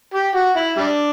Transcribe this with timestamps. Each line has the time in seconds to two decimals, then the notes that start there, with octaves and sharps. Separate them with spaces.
0.14 G4
0.35 F#4
0.56 E4
0.77 G3 D4